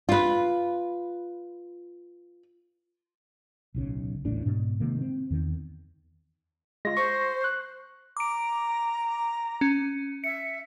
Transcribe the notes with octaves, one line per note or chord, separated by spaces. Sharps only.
F4 B4
D1 B1 C#3
D#1 A1 A2 D4
G#2 B2
C3 D#3 G#3 A#3
C4
E2 D#3
G#3 F4 A#6
C5 C#6
F#6
A#5 D6 D7
C#4
E5 C#7